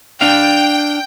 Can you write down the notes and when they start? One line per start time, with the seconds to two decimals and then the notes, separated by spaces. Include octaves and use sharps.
0.21 D4 F5 G5